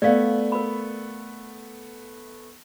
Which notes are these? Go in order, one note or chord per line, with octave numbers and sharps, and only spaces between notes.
A3 B3 D5 F5
A#4 B5